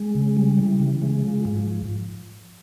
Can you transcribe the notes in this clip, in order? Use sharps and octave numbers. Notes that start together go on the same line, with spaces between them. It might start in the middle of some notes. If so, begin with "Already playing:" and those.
Already playing: G#3
C#3
G3
E3
C#3
G#3
F3
G#2